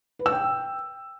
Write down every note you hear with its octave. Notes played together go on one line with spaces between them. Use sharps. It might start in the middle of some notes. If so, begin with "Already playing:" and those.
B4
E6
G5